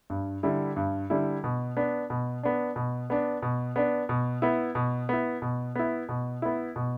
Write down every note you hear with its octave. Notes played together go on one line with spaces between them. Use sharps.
G2
D3 G3 E4
G2
D3 G3 E4
B2
B3 D4
B2
B3 D4
B2
B3 D4
B2
B3 D4
B2
B3 E4
B2
B3 E4
B2
B3 E4
B2
B3 E4
B2